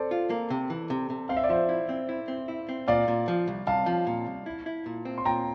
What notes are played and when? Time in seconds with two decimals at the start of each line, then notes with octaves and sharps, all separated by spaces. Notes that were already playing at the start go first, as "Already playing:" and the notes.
Already playing: A4 C5 D5
0.11 F4
0.30 A#3
0.50 C3
0.70 E3
0.90 C3
1.10 C3
1.29 C4 F5
1.37 E5
1.44 D5
1.49 F3 C5 E5
1.69 E4
1.89 C4
2.09 E4
2.28 C4
2.48 E4
2.69 C4
2.88 A#2 D5 F5
3.08 A#2
3.28 F3
3.48 C2
3.67 C2 F5 A5
3.86 F3
4.07 A#2
4.26 C2
4.46 E4
4.66 E4
4.86 A#2
5.05 C4
5.18 C6
5.25 A#2 G5 A#5